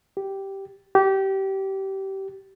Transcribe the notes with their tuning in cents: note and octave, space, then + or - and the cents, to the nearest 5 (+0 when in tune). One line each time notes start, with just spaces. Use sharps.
G4 -5
G4 -20